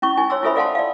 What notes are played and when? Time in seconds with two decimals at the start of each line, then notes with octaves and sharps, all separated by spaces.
0.02 C#4 E4 C#6
0.17 D#4 E4 G#5
0.30 C#5 C6 E6
0.43 E4 F4 A4 C5 E5 B5
0.56 A4 D5 F5 F#5 A5 C6
0.75 D5 F5